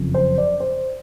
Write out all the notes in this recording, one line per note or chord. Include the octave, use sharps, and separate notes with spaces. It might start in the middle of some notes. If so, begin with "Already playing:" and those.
Already playing: F#1 F2 C#3 F3
C5
D5
C5